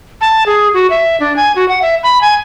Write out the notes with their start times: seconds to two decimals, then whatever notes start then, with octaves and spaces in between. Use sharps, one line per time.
0.21 A5
0.46 G#4
0.74 F#4
0.90 E5
1.20 D4
1.36 G#5
1.56 F#4
1.69 F#5
1.82 E5
2.03 B5
2.21 G#5